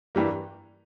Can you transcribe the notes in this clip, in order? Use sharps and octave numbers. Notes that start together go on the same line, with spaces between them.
G2 E3 G3 A#3